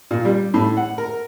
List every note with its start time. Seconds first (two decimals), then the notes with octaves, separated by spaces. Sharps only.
0.11 A#2
0.25 G3
0.54 A2
0.77 F#5
0.98 A#4